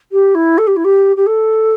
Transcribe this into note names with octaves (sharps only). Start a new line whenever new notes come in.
G4
E4
A4
G4
E4
G4
G4
A4